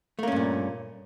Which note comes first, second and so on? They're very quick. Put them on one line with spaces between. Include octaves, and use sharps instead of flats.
A3 A#3 C#4 G2 A#2